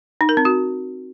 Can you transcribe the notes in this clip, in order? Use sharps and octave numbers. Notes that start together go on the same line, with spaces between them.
D#4
A#4
C4
F#4